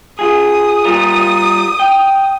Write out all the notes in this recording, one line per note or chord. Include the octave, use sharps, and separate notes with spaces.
F4 G#4 D#6
G3 F4 A#4
G5